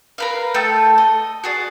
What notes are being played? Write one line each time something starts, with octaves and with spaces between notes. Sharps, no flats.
A#4 B4 F5
A3 A4 G5 E6
D#5
F#4 G#4 D5